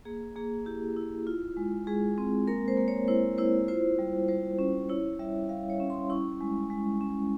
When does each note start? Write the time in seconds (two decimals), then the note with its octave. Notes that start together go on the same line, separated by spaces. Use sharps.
0.05 A#3 G#4
0.36 A#3 G#4
0.66 E4 G4
0.96 E4
1.27 F4
1.57 G#3
1.87 G#3 G#4
2.18 C4
2.48 A#3 A#4
2.68 C5
2.77 A#3
2.88 C#5
3.08 E4 C5
3.38 E4 C5
3.68 F4 C5
3.99 G3
4.28 G3 C5
4.59 C#4
4.89 E4 C#5
5.19 G3 E5
5.49 G3 F5
5.70 C#5
5.80 C#4
5.90 C6
6.10 E4 C#6
6.40 G#3
6.70 G#3
7.01 C#4